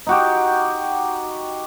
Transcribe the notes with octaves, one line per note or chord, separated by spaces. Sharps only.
D#4 F#4 G4